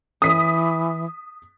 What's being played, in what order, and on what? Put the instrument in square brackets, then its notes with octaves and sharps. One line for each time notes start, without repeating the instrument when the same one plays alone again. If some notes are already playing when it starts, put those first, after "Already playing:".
[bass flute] E3 [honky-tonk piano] D#6 B6